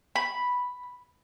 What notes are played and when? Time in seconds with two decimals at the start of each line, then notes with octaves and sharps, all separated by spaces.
0.16 B5